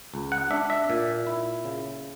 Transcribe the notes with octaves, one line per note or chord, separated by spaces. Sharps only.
C#2
F#5
D4 E5
E5
A#2
E4
C#3